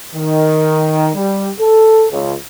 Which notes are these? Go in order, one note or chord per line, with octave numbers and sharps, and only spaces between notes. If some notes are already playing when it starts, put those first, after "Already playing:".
D#3
G3
A4
C#2